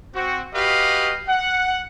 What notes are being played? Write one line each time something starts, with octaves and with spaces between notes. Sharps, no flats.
C4 F#4
F#4 G4 B4 D#5 F5
F#5